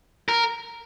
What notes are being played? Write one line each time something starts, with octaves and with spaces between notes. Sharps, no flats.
A#4